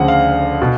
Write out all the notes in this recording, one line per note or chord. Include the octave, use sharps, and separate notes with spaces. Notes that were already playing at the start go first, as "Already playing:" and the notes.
Already playing: D2 C#3 F3 F#5
F5
B2